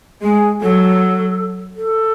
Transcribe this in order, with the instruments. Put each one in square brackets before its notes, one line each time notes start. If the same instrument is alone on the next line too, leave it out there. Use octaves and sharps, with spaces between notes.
[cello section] G#3 [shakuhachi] G#4
[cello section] F#3 [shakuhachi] A4
[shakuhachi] A4